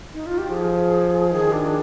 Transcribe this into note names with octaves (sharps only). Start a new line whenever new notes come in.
D#4
F4
G4
F3 G#4
D#3 G#4
D4